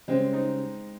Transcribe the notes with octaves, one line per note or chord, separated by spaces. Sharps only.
C#3 G3 G#3 C4 C#4
C4 D#4